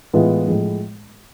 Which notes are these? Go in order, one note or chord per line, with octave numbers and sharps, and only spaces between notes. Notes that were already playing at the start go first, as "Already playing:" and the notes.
A2 E3 G#3 B3 F4
A2 F3 G#3